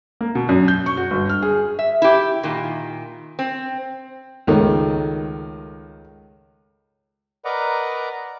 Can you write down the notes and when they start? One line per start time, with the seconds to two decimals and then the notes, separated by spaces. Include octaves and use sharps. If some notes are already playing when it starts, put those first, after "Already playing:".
0.21 A#3
0.35 B2
0.49 F#2
0.68 G6
0.86 C#6
0.97 F#4
1.11 G1
1.29 F6
1.42 G#4
1.79 E5
2.02 E4 G4
2.43 A#2 D#3
3.39 C4
4.47 C#2 D#3 A3
7.45 A#4 B4 D5 D#5 F#5 A#5